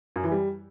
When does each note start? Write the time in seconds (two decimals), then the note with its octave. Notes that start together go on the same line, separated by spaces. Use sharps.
0.16 F#2
0.24 E3
0.32 G3